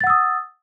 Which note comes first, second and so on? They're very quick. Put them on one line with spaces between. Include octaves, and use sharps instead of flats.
A6 F#5 E6 D#6